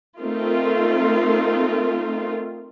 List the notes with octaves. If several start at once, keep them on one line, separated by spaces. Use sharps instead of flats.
A3 C4 D#4 F4 A#4